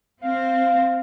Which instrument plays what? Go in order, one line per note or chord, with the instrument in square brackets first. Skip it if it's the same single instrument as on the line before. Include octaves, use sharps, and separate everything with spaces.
[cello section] C4 [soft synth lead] F5